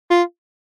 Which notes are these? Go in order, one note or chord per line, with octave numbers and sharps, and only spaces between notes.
F4